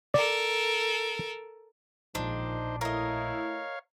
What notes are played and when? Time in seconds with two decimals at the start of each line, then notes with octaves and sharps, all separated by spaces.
0.14 A4 A#4 D5
2.15 A#1 A#2 D#3 F3 G#3 D4 D#4 C5
2.81 A3 E4 A#4 C#5 D#5 F5